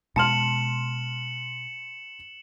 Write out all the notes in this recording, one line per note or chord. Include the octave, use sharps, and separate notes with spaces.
B2 G#3 A5 C6 F6 C#7 E7 F#7